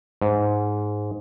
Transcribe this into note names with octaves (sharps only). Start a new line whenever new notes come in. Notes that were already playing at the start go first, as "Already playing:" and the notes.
G#2